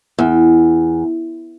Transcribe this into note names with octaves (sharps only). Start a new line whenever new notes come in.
E2